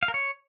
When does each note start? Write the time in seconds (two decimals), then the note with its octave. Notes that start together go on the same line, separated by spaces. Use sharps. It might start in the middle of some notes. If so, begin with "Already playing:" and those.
0.03 F5
0.08 A#4
0.14 C#5